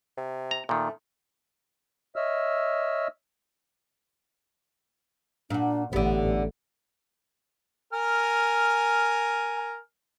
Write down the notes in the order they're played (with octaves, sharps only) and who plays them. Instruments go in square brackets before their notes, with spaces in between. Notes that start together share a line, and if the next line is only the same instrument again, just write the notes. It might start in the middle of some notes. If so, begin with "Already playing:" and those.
[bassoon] C3
[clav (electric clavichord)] A#5
[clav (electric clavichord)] A#2 D#3 [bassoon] A3
[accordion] C#5 D#5 E5 E6 F6
[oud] A#2 F#4 [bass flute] D4
[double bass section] A1 [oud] D3 B3 [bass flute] G4
[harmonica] A#4 G#5 F6